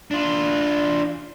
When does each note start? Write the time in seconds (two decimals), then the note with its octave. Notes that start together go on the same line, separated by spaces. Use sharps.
0.11 D4 F4